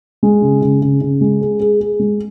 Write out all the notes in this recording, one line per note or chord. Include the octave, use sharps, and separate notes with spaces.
G#3
C#3
C#3
C#3
C#3
G#3
G#4
G#4
G#4
G#3